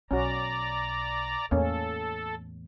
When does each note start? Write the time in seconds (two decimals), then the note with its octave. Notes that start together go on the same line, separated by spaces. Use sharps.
0.11 B1 C#4 F#4 D5 A#5
1.51 E2 A2 A#3 C#4 A4